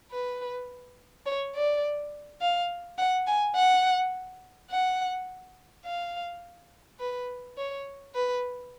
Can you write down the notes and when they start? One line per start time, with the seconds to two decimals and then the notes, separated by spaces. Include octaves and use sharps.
0.12 B4
1.26 C#5
1.55 D5
2.42 F5
2.98 F#5
3.27 G#5
3.56 F#5
4.71 F#5
5.85 F5
7.00 B4
7.57 C#5
8.15 B4